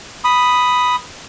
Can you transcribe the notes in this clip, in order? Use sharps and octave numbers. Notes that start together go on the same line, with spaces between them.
B5 D#6